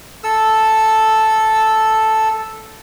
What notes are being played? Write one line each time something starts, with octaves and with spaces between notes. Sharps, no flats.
A4 E6